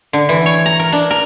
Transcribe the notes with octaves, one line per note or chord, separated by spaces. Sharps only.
D3
E3
C#5
A#5
A#4
D4
A#4